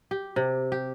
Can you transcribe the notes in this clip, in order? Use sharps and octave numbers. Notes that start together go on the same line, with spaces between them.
G4
C3
G4